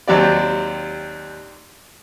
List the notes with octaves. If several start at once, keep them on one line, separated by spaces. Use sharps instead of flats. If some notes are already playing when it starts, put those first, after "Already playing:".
D#2 F#3 C4 G4 D5